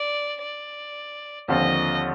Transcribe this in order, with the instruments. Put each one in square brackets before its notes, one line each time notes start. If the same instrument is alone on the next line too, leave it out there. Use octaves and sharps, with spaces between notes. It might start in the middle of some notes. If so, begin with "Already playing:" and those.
Already playing: [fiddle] D5
D5
[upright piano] D#2 D3 F3 C4 F4 [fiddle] D#5